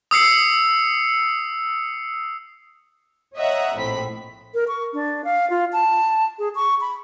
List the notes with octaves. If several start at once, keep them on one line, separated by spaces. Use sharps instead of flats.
D#6 E6 C7 C#7
C#5 D#5 E5 F#5 A#5
A#1 A2 C4 B5 B6
A#4
C#6
D4
F5
F4
A5
G#4
C#6
B5